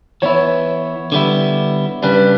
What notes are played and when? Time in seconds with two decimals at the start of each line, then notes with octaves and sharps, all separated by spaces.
0.22 E3 B3 E4 C#5
1.12 D3 G3 B3 E4
2.03 C#3 G3 D4 B4